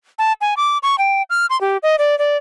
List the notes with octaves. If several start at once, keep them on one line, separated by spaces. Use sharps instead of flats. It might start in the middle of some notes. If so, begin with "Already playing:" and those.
A5
G#5
D6
C#6
G5
F6
C6
G4
D#5
D5
D5